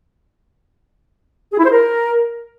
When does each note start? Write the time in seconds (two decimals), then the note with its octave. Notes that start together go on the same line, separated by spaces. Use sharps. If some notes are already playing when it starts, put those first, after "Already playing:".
1.52 G#4
1.59 E4
1.65 C5
1.72 A#4